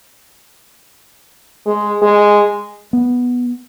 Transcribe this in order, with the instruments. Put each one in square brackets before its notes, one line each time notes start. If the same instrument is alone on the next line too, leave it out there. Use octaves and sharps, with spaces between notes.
[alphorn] G#3
G#3
[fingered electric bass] B3